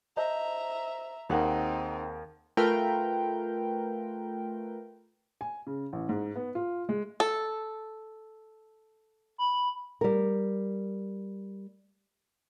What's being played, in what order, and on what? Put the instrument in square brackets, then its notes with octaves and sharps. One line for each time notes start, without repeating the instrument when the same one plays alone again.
[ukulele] C5 D#5 A5 [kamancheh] E5 A#5
[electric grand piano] D#2 A#4 [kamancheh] C4 D#4 [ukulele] G#4 F5 F#5
[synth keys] A3 F4 A#4 B4 G5
[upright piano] G#5
C#3
A1
G#2
B3
F4
G#3
[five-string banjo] A4
[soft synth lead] B5
[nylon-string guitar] G3 A#4